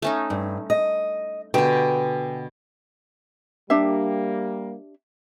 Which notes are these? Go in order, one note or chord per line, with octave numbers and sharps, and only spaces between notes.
A3 C#4 D#4
G2
D#5
B2 D3 G4 G5 G#5
G3 A#3 D4 G4 E5